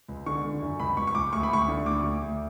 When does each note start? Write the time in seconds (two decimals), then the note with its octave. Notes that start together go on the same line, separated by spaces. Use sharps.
0.08 C#2
0.26 D3 C#6
0.44 D3
0.62 F#2
0.80 C#2 B5
0.97 C#2 C#6
1.07 C#6
1.15 C#2 D6
1.33 D2 C#6
1.43 B5
1.51 D2 C#6
1.68 D3
1.86 D2 D6
2.04 D2
2.22 D2